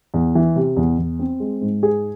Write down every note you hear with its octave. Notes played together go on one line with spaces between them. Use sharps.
E2
E3
C3
E2
E2
C4
G#3
G#2
G#4